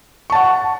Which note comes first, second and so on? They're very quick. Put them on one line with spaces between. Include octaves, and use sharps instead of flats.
C#6 A5 F#5